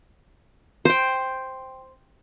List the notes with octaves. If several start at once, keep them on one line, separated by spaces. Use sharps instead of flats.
C5 G5